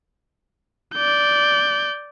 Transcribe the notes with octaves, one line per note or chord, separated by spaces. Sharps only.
D5 G6